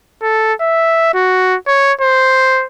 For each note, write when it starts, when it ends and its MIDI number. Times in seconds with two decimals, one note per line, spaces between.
0.23 0.54 69
0.61 1.11 76
1.14 1.56 66
1.67 1.93 73
2.01 2.66 72